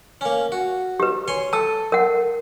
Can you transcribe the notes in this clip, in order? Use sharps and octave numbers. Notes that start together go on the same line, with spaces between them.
A#3 C#4
F#4
G4 B4
C#5 G#5 C6
A4 A5 E6
A#4 F#5